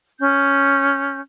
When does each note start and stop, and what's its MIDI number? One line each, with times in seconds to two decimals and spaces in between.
0.20 1.21 61
0.20 1.21 91